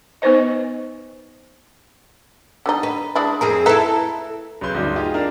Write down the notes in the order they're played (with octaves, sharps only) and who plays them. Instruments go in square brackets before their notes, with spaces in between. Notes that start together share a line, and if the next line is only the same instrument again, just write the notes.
[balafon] B3 D#4 B4 C5 D#5
[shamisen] D3 G3 D#4
[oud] B4
[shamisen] G#3 D4 E4
[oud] F2 C4 G#4 [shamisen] A#4
[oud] E4 A4 [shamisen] B4 E5 A#5
[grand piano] B1 C#3 B4 C6 G6
D2 G2 D#4 F#4
D#4 F4 G4 G#4
D4 A#4 D5 F5